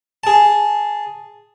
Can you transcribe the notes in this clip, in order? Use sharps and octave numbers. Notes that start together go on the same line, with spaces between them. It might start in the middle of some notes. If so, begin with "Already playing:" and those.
G#4 A5